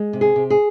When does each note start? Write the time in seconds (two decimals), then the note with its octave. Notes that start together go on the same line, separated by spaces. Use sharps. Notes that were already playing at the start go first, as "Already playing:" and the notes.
Already playing: G#3
0.13 C3
0.21 G#4
0.36 C3
0.50 G#4